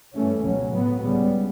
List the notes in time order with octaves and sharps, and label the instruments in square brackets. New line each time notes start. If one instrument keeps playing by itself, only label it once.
[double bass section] G2 E3 A3 C#4
C#2 B2 F#3 C#4
A2 F#3 B3
C#2 C#3 G3 B3